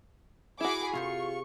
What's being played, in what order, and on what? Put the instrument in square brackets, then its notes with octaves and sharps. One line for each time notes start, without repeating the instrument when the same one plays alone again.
[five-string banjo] E4 F#4 [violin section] G#4 B5 D6
[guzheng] C3 G#4 C5 [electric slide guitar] F4 [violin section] C#6